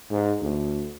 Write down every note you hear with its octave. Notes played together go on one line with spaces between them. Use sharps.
G#2
D2